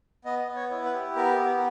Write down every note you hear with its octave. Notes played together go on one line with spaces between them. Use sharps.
B3 D#5
B3
C#5
E4
B4
G4
B3 A#4
B3